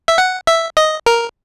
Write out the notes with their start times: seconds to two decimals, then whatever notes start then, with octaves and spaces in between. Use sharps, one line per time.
0.08 E5
0.18 F#5
0.47 E5
0.77 D#5
1.06 A#4